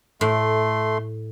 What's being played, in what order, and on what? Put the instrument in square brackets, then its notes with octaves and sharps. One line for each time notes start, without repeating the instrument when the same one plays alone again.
[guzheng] A2 [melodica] A3 C6